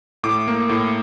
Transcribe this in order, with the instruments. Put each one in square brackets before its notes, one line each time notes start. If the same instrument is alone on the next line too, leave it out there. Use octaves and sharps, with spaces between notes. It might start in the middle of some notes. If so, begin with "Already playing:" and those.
[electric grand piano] A2 D6
A#3
A2